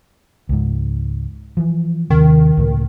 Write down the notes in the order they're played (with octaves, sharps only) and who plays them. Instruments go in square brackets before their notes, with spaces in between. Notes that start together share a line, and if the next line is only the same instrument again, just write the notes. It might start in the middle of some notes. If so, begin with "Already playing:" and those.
[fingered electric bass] C#2 G#2
E3 F3
[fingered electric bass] D#2 C3 [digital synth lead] D#3
[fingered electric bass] C#2 A2